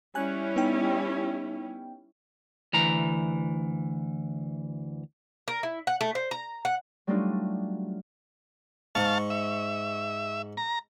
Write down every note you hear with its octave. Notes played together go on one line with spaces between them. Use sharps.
G3 C#4 E4 G#5 F#6
B3 D#4 G5
D2 E3 A#5
A#4
E4
F#5
A3
C5
A#5
F#5
F#3 G3 A3 D4 D#4 F4
G#2 F5 A5 C#6
E5
A#5